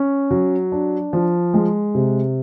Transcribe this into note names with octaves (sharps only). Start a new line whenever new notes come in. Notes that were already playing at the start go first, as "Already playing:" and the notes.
Already playing: C#4
F#3
D4
F3
G#3
C3